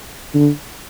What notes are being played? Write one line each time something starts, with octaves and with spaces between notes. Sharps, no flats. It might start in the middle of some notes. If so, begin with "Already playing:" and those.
D3